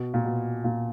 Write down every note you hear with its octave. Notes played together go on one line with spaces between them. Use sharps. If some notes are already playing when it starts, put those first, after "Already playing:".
Already playing: B2
A#2
B2
A#2